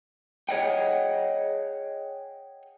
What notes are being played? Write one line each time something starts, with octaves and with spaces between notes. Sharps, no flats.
G#4 C#5 D#5 F#5 G5